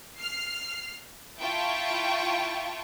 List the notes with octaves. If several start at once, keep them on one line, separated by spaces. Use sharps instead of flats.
F6 C7
E4 F4 G5 A5 C#6